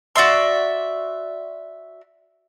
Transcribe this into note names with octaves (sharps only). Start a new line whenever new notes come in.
F#4 D5 E5 C6